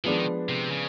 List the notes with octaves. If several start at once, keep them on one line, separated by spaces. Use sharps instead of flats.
D#3 F3 G#3 B3 D4
C3
C#3